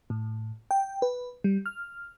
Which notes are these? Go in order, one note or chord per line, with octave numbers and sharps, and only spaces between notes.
A2
G5
B4
G3
F6